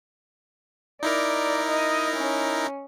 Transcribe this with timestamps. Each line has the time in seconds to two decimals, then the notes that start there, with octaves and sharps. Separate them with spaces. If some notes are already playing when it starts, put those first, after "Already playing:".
1.03 D#4 E4 A#4 D5
1.70 D#5
2.16 C#4